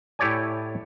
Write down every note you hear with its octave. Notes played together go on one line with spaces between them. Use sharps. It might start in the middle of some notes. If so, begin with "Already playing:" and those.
A2 E4 G4 C#5 D5 G#5